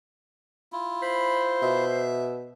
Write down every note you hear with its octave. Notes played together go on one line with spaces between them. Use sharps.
E4 F4
C5 B5
B2 E5